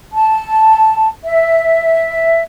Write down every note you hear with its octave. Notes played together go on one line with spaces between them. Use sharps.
A5
E5